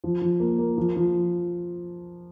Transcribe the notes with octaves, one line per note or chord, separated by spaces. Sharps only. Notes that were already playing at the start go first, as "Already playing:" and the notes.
F3
F3
A#3
A#3
F3
F3